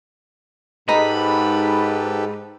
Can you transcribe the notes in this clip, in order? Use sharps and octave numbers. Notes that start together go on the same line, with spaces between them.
G#2 G4 A4 B4 D#5 A#5 B5